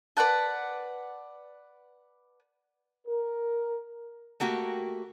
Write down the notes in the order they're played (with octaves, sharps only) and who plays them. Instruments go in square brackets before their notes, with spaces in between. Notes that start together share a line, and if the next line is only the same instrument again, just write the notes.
[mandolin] B4 D5 F#5 A5
[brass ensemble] A#4
[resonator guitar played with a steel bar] A3 A#3 F#4 G4